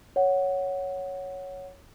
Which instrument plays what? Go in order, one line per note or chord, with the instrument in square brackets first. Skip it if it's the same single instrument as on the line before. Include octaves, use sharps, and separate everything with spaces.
[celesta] C#5 F#5